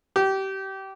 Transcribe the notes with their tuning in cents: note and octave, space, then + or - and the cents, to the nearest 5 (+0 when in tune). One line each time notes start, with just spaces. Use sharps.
G4 -25